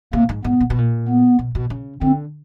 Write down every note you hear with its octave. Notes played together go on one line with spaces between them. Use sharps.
C3 A#3
G#2
G#2 B3
A#2
B2
A#2
B3
B2
B2
C#3
D3 C4